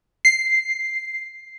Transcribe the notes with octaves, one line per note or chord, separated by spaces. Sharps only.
C7